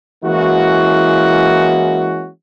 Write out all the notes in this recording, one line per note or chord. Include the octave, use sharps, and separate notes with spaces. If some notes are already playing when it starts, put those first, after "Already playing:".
E3 G#3 A#3 C#4 E4 F#4